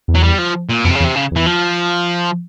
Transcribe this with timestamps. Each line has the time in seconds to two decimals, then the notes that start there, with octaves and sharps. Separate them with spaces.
0.08 E2
0.15 F#3
0.23 G3
0.38 F3
0.69 A#2
0.85 F2 B2
0.91 C3
0.95 C#3
1.00 E2
1.05 C3
1.16 C#3
1.31 E2 E3
1.46 F3